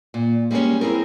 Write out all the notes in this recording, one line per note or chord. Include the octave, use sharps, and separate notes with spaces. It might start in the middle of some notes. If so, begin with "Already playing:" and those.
A#2
G3 G#3 A#3 C4 C#4
C4 E4 G#4 A#4